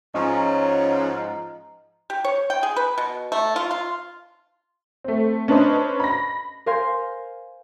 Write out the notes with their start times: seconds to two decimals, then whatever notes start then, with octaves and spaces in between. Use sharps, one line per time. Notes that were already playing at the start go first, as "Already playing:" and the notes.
0.14 G#2 F3 C#4 D#5 A#5
2.10 G4
2.25 C#5
2.50 G5
2.63 G#4
2.76 B4
2.98 B2
3.32 A3
3.56 F4
3.71 F4
5.04 A3 C4
5.48 C#4 D4 B4 C5 D#5
6.00 B5 A#6
6.66 A#4 C5 F5 G#5 C6